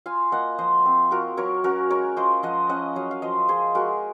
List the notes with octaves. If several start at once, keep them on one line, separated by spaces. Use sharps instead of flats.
F4 F5 G#5
A#3 D#5 F#5
F3 C5 D#5
C4
F4 F#4 A#4
F#3 A#4 C#5
C#4 F#4 A#4
G#3 A#4 C#5
F4 C5 D#5
F3 D#5 F#5
C#4 D#5 F#5
F#3 C#5 F5
F5
F3 C5 D#5
F4 G#4 C5
G#3 F#4 A#4